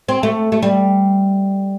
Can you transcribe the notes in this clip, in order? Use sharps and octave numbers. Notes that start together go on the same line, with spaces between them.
C4
A3
A3
G3